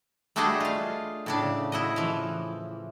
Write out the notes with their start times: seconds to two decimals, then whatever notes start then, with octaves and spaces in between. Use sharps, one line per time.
0.36 G3 A3 D4 F#4 G#4 D#5
0.60 F4 F5
1.26 A2 C#3 D4
1.72 E4 F#4 D#5
1.96 E3 F3